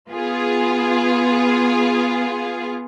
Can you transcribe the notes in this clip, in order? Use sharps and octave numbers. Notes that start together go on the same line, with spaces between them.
B3 F4 G#4